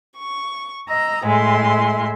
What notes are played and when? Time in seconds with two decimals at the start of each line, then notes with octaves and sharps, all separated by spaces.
0.17 C#6
0.88 D#5 A#5 E6
1.24 A2 G#3 E5 C6